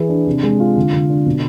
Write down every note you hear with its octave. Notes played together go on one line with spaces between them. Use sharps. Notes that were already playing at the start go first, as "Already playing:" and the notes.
Already playing: E3 G#4
D4
C3
G#3
F4
D3
D3
D4
B2